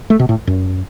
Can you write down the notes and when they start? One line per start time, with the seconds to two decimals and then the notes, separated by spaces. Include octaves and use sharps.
0.10 A3
0.19 B2
0.29 A2
0.47 F#2